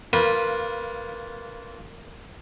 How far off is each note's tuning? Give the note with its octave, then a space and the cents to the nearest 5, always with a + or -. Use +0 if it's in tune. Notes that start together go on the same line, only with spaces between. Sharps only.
A#3 -20 F4 +5 B4 -15